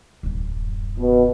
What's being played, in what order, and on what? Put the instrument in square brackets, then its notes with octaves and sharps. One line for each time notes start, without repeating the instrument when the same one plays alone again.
[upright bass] D1 F#2
[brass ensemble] B2